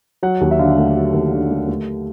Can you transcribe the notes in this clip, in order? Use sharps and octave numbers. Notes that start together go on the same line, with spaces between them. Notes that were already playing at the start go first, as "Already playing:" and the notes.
F#3 F#5
D#2
E5
D3 F5
A3
F#3
D#2
D3
A3
A3